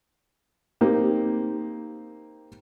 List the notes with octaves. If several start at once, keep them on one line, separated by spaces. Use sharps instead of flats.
A#3 C4 D#4 G4